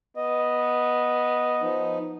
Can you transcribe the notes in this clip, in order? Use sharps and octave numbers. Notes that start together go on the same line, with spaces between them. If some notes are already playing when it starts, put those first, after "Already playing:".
B3 D#5
F3 D#4